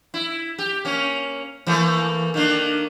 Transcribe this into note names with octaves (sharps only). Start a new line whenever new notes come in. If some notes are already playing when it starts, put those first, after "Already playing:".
E4
G4
A#3 C#4
E3 A3 A#3
D#3 A#3 D4